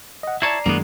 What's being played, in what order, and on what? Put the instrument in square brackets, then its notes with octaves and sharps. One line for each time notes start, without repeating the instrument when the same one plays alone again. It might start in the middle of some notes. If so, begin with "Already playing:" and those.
[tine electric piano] D#5 F#5
[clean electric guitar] E4 C#5 A5 [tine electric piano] D5 A#5 C7
[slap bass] F#2 D#3 G#3 [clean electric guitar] A#3 B3